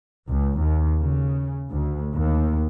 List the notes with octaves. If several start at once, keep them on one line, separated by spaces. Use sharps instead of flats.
C#2
D#2
C#3
D2
D#2